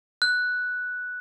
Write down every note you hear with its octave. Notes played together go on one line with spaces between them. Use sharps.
F#6